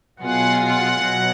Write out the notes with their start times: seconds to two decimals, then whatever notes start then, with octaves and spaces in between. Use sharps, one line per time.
0.19 B2 F#3 B3 F4 G#4 F#5
0.59 F#5
0.98 B2 F#3 B3